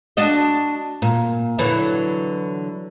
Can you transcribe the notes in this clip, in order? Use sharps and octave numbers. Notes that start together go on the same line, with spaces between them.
D4 F#4 D#5
A#2
D3 E3 F#3